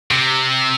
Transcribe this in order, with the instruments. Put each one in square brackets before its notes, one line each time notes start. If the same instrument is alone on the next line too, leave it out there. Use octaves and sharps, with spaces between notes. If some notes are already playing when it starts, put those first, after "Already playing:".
[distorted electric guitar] C3